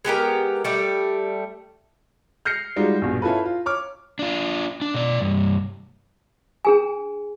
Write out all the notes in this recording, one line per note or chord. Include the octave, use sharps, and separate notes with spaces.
G#3 B3 G4 A#4
G3 A3
F6 G6 A#6 C7 C#7
G3 G#3 D#4 F4 F#4
A#1 G2 B2
C#4 E4 F4 A4 B4
F4
C#5 D6 F6
D4 F4
D4
B2 D5
C2 G2
D4 G#4 G#5